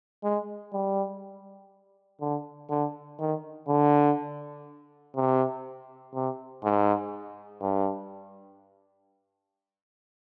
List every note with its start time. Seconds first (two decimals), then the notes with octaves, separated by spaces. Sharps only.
0.24 G#3
0.73 G3
2.21 D3
2.70 D3
3.19 D#3
3.68 D3
5.16 C3
6.14 C3
6.64 G#2
7.62 G2